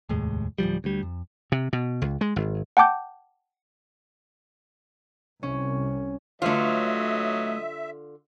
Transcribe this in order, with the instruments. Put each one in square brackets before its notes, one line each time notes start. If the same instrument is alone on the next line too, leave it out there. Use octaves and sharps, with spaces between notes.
[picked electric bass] F1 D#2 A2 G#3
D1 D#2 F3 G3
D2 G3
F2
[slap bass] C3
B2
C#2
G#3
G#1
[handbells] F#5 G5 A5 D6 G6
[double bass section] C2 [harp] C#4
[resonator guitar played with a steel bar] D3 F4 [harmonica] F#3 D#5 [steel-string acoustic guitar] A3 B4 C#5 [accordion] E5